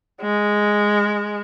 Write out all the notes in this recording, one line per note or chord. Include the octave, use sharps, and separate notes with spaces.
G#3